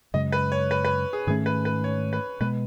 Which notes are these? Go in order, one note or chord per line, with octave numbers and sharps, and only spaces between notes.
F#2 C#3 G#3 D#5
B4
C#5
B4
B4
G#4
G#2 D#3 A3 C#4 G#4
B4
B4
C#5
B4
B2 G#3 B3 B4